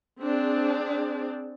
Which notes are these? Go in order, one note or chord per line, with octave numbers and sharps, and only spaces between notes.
C4 D4 G#4